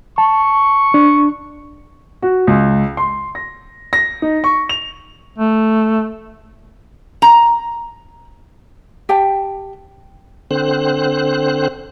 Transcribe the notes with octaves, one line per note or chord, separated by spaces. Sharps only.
A5 C#6
D4
F#4
C#2
C6
A#6
A#6
D#4
C#6
F7
A3
A#5
G4 G5 A5
D3 C4 C5 F#6